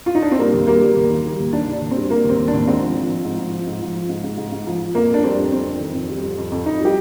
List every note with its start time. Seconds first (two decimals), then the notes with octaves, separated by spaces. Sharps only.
0.06 F4
0.15 D#4
0.22 D4
0.31 C4
0.39 G3 A#3
0.53 D#2
0.67 G3 A#3
0.81 G3
0.96 D#2
1.10 D#3
1.24 G3
1.39 D#2
1.53 D#3 D4
1.68 D#2
1.73 D4
1.81 D#2
1.91 C4
1.96 G3
2.10 G3 A#3
2.25 D#2 C4
2.39 D#2
2.48 D4
2.53 D#2
2.68 G#2 C4
2.82 F3
2.96 F3
3.10 F3
3.24 G#2
3.39 F3
3.52 F3
3.67 G#2
3.81 F3
3.95 F3
4.09 G#2
4.24 G#2
4.38 G#2
4.52 G#2
4.67 F3
4.80 F3
4.95 F2 A#3
5.09 F2 D4
5.23 G3 C4
5.38 F2
5.52 F2 C4
5.67 F2
5.80 D#3
5.94 F2
6.10 G3
6.23 F2
6.38 F2
6.52 F2
6.66 F2 D#4
6.81 G3 G4